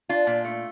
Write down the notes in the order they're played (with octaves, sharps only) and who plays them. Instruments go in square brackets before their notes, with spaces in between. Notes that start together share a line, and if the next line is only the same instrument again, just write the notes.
[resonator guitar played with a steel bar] D4 F4
A#2
A3